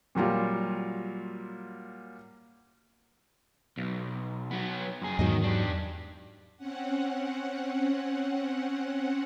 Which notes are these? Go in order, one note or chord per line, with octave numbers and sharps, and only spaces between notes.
A#2 F#3 G3 F4
B1
F#3 B3
F#2 G#4
E2 G#2 D#3 F#3 D#5
D4 G4
C4 C#4 F#5